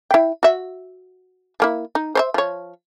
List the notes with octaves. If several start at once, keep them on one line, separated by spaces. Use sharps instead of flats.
E4 G5
F#4 E5
F3 A#3 E4
D#4
C5 C#5 E5
F3 C#5